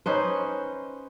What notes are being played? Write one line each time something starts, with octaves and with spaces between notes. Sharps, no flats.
C#4 D#4 B4 C5